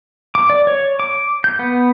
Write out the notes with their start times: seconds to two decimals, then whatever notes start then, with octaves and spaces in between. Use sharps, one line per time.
0.35 D6
0.50 D5
0.67 C#5
1.00 D6
1.44 G6
1.59 B3